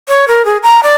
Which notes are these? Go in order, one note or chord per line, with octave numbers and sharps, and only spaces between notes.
C#5
A#4
G#4
A#5
D5